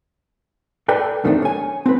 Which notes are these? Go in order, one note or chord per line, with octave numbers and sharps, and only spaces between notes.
A4 B4 D5 G5
F#2 D#3 A3 C4 D4
C#5 G#5
C4 B4